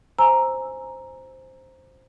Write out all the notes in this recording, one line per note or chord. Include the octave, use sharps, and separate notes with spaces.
C5 G#5 A#5 E6